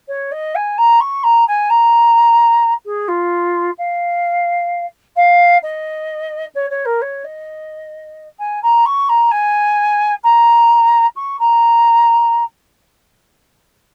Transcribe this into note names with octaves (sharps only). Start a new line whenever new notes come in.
C#5
D#5
G#5
A#5
C#6
A#5
G#5
A#5
G#4
F4
F5
F5
D#5
C#5
C#5
A#4
C#5
D#5
G#5
A#5
C#6
A#5
G#5
A#5
C#6
A#5